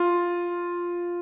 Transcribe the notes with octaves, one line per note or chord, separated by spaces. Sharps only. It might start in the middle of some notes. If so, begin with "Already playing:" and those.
Already playing: F4